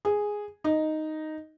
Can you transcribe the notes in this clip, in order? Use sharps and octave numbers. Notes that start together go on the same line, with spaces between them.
G#4
D#4